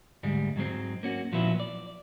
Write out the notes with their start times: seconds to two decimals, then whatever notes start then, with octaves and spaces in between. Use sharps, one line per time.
0.23 D2 G#2 G3 G#3
0.56 G#2 F#3 G#3 C4
1.03 A#3 C#4 F#4
1.32 A#2 F3 F#3 B3 E4
1.60 D5